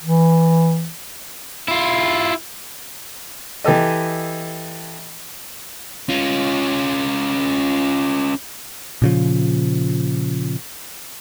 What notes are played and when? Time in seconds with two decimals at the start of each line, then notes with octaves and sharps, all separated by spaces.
0.03 E3
1.68 E4 F4
3.64 E3 G4 A4 D#5
6.09 C#4 F4
9.02 A#2 C#3 F3